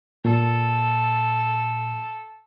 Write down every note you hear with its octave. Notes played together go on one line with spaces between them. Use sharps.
A#2 A4